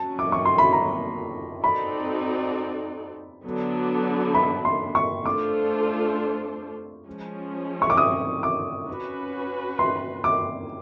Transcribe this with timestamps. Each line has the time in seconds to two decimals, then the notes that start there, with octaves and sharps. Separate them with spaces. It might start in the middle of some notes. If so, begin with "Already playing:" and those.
Already playing: F#3 A#3 C#4 A5
0.19 D6
0.32 C#6
0.45 C6
0.58 B5
0.73 A#5
1.63 C4 D#4 F#4 A4 D5 B5
3.45 D3 F#3 B3 D4
4.34 B5
4.65 C6
4.95 C#6
5.25 A3 D4 F4 A4 C5 D6
7.07 F3 G#3 C#4
7.82 C#6
7.90 D6
7.97 D#6
8.43 D6
8.89 C#4 F#4 B4
9.79 C6
10.24 D6